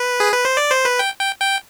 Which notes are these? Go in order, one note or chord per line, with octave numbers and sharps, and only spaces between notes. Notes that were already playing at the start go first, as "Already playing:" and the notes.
Already playing: B4
G#4
B4
C5
D5
C5
B4
G5
G5
G5